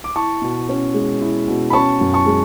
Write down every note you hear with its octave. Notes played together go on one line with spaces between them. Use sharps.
D6
E4 A5 C#6
B2
C#4
G#3
E4
B2
B5
C#4 A5 C#6
F#2
A5 C#6
G#3